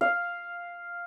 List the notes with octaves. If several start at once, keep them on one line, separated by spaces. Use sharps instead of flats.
F5